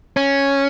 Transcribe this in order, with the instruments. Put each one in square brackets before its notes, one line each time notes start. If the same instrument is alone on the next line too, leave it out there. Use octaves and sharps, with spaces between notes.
[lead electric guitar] C#4